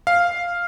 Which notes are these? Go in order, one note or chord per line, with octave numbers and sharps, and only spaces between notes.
F5